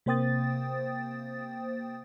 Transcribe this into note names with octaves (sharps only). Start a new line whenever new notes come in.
C3 A#3 C5 G5 D#6 A6